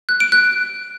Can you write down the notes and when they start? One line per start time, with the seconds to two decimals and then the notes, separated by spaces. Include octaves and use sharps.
0.09 F#6
0.20 D7
0.32 F#6